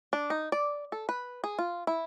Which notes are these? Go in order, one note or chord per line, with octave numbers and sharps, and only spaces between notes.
D4
D#4
D5
A4
B4
G#4
F4
E4